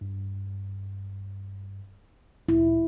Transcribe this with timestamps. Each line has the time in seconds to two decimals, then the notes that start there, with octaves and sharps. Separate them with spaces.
0.01 G2
2.49 D2 A#2 E4